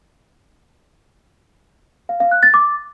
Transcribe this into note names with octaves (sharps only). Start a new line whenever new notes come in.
F5
F5
F#6
A6
D6